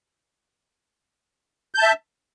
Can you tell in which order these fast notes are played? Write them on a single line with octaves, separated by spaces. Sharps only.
G6 A5 E5